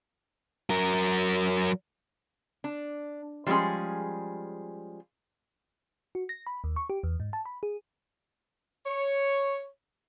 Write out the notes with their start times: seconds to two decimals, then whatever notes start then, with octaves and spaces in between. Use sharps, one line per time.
0.70 F#3 A#4
2.64 D4
3.47 F3 G3 G#3 C#4 G#4
6.15 F#4
6.29 A#6
6.47 B5
6.64 D#2
6.76 C#6
6.90 G4
7.03 E2
7.20 G#2
7.33 A5
7.46 B5
7.63 G#4
8.86 C#5